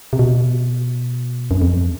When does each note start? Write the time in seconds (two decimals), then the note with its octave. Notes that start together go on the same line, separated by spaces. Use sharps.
0.13 C3
0.19 B2
1.51 F#2
1.62 F2